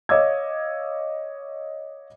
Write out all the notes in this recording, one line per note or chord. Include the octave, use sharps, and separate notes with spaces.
C#5 D#5 F5 D6 E6 G#6